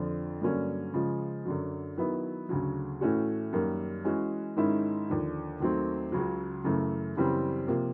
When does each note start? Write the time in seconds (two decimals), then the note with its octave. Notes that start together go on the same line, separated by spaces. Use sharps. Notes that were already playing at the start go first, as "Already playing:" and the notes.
Already playing: F2 D3 F3
0.41 G2 D3 F#3 A#3 C#4
0.94 C#3 F3 G#3
1.45 F#2 D3 F#3
1.98 D#3 F#3 B3 E4
2.49 D2 C#3 F#3
3.01 A2 E3 A3 C#4 F#4
3.53 F#2 D#3 G3 A#3
4.05 E3 G#3 C#4 F#4
4.56 G#2 D#3 G#3 C#4 E4
5.09 D#2 D3 F3
5.60 D#2 D#3 F#3 A3 C4
6.12 C#2 C#3 F#3
6.64 F#2 C#3 E3 A3
7.17 F#2 C#3 E3 G3 C4
7.68 C3 F3 A#3